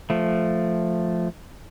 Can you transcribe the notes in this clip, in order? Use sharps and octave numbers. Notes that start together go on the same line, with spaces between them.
F3 A3